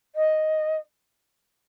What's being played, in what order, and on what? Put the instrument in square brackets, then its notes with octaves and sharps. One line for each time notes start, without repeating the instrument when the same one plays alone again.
[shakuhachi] D#5